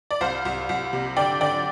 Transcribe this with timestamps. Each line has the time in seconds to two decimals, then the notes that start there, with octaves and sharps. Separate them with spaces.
0.11 D5
0.21 C2 C5 F5
0.45 C2
0.69 C2
0.93 C3
1.17 D3 D5 G5
1.41 D3 D5 G5